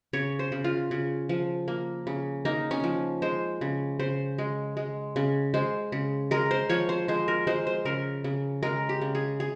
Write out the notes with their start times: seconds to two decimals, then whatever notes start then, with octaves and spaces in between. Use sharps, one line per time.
0.13 C#3 C#5
0.39 C5
0.52 C#3
0.64 F4
0.91 C#3
1.29 F3
1.68 A#3
2.07 C#3
2.45 A#3 D#4
2.71 C#4
2.84 F3
3.22 G#3 C5
3.61 C#3
3.99 C#3 C5
4.38 G#3
4.77 G#3
5.16 C#3
5.54 G#3 C5
5.92 C#3
6.31 G#3 A#4
6.51 C5
6.70 F3 C#5
6.89 C5
7.08 G#3 C5
7.28 A#4
7.47 G#3 C5
7.67 C5
7.85 C#3 A#4
8.24 C#3
8.63 G#3 A#4
8.89 G4
9.01 C#3
9.15 G#4
9.40 G#4